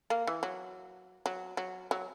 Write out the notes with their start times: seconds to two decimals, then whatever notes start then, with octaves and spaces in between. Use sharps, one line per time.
0.10 A#3
0.27 E3
0.43 F#3
1.26 F#3
1.57 F#3
1.91 F#3